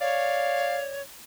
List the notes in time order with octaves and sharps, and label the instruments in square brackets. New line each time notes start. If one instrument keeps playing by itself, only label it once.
[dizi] C#5 [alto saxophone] D5 [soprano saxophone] F5